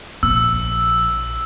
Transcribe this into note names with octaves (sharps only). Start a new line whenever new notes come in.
A#1 E6